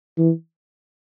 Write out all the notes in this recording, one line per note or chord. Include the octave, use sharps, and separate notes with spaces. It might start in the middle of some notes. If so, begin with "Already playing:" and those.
E3